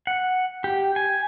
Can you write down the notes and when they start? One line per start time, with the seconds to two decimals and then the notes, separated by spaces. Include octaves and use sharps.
0.07 F#5
0.64 G4
0.96 G#5